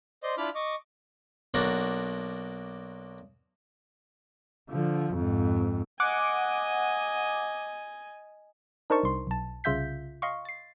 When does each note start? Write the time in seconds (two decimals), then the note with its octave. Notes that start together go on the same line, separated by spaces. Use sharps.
0.23 C5 D5 D#5 C6
0.37 D4 E4 F4 B5 D6 F6
0.55 D#5 C#6 D6
1.54 B1 A#3 D4 F#4
4.70 D3 F3
5.13 F2 G#2
6.00 D#5 F#5 G#5 D6
8.90 D4 D#4 A#4 C5 A5 C#6
9.03 C2 C6
9.27 B1 A5
9.64 C2 C#3 F4 E5 G6 B6
10.22 D#5 F5 C6 C#6
10.45 A6 C7